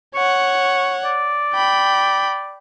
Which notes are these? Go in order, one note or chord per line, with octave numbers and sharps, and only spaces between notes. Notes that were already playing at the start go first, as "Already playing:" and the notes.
C#5 F#5 C#6
D5
G5 B5